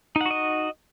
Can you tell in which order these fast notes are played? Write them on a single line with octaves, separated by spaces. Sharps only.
D#4 F#5 F#4 D#5